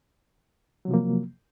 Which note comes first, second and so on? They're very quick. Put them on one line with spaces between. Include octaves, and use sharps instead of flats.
F#3 C3 F3 A#3